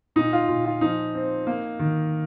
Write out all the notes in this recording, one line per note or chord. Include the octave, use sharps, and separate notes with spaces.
A#2 D#4
F4
A#2
F4
F3 D#4
C4
A#3
D#3